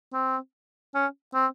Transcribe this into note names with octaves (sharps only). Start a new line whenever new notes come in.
C4
C#4
C4